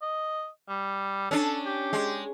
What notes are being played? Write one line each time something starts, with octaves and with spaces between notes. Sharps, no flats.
D#5
G3
C#4 D4 A4
G4
G#3